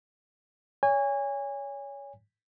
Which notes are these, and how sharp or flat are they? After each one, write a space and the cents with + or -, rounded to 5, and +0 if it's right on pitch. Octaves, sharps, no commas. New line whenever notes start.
C#5 +25 G#5 -25